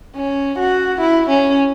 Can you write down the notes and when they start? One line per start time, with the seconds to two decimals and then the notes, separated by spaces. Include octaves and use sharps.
0.16 C#4
0.59 F#4
1.01 E4
1.29 C#4